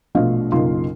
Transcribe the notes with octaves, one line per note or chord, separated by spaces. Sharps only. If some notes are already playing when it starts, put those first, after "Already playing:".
A#1 B2 A3 F4 D#5 F5
F#1 B1 A#3 F4 C6